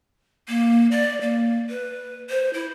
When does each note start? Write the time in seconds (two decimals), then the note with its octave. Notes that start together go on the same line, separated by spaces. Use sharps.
0.49 A#3
0.91 D5
1.21 A#3
1.70 B4
2.30 C5
2.54 E4